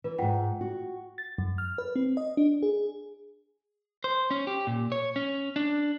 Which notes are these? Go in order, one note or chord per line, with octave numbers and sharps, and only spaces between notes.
E3 B4
F2 G#2 F4 F#5 G5
F#4
A6
F#2
F6
B4
C4
D#5
D4
G#4
C5
C#4
G4
A#2
C#5
C#4
D4